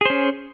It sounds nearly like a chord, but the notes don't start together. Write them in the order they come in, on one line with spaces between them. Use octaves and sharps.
G#4 C5 C#4